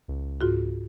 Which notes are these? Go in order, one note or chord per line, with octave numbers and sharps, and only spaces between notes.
C#2
G#2 F4 F#4